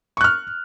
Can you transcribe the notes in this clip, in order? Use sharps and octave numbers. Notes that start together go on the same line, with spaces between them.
C#6 F6 F#6